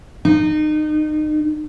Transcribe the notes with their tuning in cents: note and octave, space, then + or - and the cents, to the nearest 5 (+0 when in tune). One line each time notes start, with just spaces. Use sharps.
D#4 -30